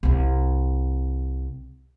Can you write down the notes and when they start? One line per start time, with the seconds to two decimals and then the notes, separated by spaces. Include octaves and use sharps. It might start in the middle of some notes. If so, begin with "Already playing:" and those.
0.03 C2 C4